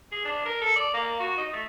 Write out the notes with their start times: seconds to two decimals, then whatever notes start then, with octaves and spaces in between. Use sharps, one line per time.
0.12 G#4
0.25 D4
0.46 A#4
0.62 A4
0.76 D5
0.94 A#3
1.20 F#4
1.38 D#4
1.53 A3